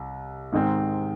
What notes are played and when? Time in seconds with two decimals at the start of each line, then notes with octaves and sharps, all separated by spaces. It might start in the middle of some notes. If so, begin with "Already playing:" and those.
Already playing: C2
0.52 G#2 D#3 G#3 C4